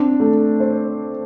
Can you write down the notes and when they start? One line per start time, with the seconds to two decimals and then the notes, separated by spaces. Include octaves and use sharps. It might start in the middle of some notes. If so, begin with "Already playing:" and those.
Already playing: C4 D4
0.20 A3
0.60 C5